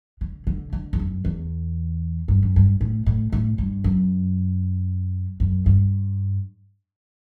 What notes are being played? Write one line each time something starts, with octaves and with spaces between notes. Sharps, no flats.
D3
D3
D3
E2
F#2
E2
G2
F#2
G2
A2
A2
A2
G2
F#2
F#2
G2